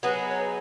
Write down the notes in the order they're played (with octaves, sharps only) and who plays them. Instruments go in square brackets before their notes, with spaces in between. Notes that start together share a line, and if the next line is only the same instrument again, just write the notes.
[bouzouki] F#3 B3 D#4 G#4 [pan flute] B4
[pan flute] C#5